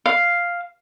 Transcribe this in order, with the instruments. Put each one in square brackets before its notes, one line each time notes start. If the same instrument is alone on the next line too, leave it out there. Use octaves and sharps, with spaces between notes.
[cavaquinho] F5